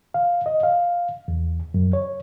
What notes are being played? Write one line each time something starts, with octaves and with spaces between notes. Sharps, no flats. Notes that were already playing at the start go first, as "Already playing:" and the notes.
F5
D#5
F5
E2
F#2
C#5